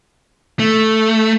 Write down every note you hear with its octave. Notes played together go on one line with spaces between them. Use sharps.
A3